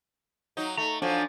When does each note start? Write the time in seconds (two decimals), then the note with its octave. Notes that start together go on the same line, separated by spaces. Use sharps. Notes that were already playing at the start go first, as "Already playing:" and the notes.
0.57 F#3 D#4
0.77 A3 A#5
1.02 F3 F#3 D4 G#5